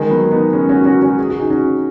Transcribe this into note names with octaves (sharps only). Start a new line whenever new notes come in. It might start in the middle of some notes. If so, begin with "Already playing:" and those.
Already playing: D#3 G#3
F#3 B3
B3 D#4
G#3 C#4
C#4 F#4
C#4 F#4
C#4 F#4
G#4
F#4
D#4 G#4
C#4 F#4